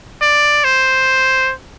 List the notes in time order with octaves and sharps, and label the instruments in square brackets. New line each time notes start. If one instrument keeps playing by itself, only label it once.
[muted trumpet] D5
C5